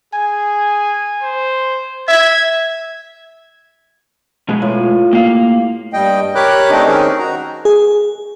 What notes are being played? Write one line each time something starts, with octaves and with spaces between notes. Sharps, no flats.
G#4 G#5
C5
E5 G#6
B2 G#3 G#4
A2 F4
A#3 G4 F5
G2 G3 D#5 G5
G4 A#4 C#5 B5 D6 F#6
A3 C4 D4 D#4 D#5
D#3 C4 C#4 D#4 G#4 A#4
F#4 A#5
G#4